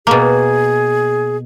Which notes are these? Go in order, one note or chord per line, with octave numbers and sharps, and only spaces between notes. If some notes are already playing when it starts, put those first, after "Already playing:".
B2 A#3 G#4